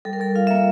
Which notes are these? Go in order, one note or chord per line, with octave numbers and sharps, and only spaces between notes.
G3 A4
A#4
G3 A4
F4 F5
A#3 E5